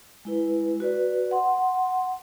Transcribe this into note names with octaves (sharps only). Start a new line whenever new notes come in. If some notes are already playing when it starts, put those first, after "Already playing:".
G#3 E4 B4
F#4 B4 D5
F#5 C6